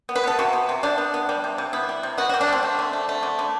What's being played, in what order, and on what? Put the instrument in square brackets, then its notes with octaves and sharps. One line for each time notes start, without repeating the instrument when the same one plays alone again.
[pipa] B3
B4
B3 A4
C3 F#4
B3
C3
C3 D4
B3
B3
G3
C3
C3
B3 E4
G3
C3
B3 F#4
G3 F#4
D4
G3 C4
A3
D3
A3
A3
D3
D3